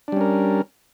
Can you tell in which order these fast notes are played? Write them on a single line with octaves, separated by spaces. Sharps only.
D4 G3 C#4 A#4